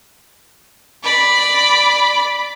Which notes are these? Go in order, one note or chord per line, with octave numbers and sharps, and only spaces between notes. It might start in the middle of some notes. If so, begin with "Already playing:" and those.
D5 B5